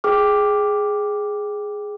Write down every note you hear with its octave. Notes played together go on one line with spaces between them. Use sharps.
G#4 G5 D6 F6